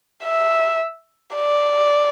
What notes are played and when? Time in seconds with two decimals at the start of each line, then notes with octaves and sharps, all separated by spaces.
0.24 E5
1.36 D5